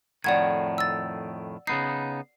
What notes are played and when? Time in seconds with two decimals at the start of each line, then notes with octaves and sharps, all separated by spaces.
0.24 F2 A2 D#3 D5 F#5 G#6
0.78 E6 A6
1.67 C#3 B3 D#4 C7